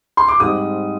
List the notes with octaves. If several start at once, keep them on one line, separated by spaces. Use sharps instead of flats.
C6
D6
G#2 G3 C4 D#6